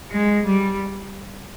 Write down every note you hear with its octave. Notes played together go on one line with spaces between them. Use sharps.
G#3
G3